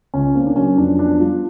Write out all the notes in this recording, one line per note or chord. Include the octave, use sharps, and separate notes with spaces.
C#2 C#4
A#3 C4
D4
F#3 C#4
F2 D4
B3 D4
G3 F4